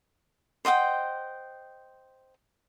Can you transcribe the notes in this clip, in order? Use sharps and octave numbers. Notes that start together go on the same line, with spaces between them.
C5 D#5 F#5 G5